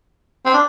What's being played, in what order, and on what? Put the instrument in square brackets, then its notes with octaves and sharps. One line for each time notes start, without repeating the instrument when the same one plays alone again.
[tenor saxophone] C4
D4